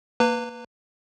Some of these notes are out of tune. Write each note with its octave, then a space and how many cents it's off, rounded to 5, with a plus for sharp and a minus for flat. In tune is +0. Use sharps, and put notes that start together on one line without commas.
A#3 +0 B4 +0 A#5 -40